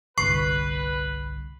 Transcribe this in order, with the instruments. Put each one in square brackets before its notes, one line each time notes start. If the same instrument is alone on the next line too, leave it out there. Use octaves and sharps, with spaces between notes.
[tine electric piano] G1 C2 [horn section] B4 [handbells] C#6 [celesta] C7